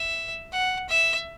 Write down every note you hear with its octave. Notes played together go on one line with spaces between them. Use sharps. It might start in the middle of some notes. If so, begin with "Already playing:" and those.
Already playing: E5
F#5
E5